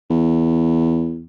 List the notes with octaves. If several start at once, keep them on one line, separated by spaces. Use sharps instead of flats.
E2